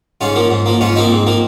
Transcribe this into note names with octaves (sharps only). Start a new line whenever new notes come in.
G#2 C#4 F4
F3 A#3
G#2
F3 A#3
G#2 C#4 F4
F3 A#3 C4 D#4
G#2
F3 A#3